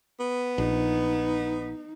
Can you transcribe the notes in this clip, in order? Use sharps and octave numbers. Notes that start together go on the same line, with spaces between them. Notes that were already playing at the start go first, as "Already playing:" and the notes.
B3
A#1 D#4